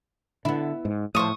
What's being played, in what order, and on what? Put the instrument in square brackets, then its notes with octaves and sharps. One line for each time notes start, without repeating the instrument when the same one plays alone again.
[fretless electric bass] D3 [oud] B3 E4
[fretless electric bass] G#2
[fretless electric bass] A2 [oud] F3 C5 [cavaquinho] C#6 D#6